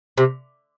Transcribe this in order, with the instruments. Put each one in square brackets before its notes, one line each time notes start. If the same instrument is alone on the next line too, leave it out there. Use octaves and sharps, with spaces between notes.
[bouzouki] C3